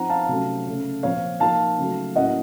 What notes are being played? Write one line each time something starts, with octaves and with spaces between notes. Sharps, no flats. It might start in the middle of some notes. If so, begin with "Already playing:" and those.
Already playing: F3 C4 D#4 F#5 A#5
F5 A5
C3 F#3 A3 C#4
C#3 A3 C#4
A#2 F3 C4 C#5 F5
F3 A#3 D#4 F5 A5
C#3 F#3 A3
A2 F#3 A#3 C#4 D#5 F#5